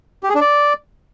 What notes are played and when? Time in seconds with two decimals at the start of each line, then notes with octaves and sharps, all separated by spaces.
0.23 G4
0.29 G#4
0.35 D4
0.41 D5